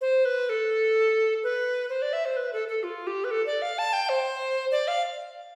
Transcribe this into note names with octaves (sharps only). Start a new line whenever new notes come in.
C5
B4
A4
B4
C5
D5
E5
C5
B4
A4
A4
F4
G4
B4
A4
D5
F5
A5
G5
C5
D5
F5